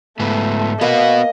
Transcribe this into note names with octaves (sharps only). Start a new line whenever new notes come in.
G#2 A3 B3
A#3 B3 F#4 D#5